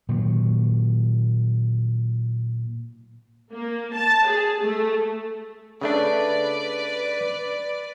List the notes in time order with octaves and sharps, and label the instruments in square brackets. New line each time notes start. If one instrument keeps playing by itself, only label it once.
[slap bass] A#2 D#3 F#3
[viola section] A#3
A5
G#4
A3
[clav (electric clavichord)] C#3 A3 D4 [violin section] B4 D5